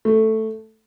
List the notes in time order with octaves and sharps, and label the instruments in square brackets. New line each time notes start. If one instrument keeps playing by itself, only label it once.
[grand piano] A3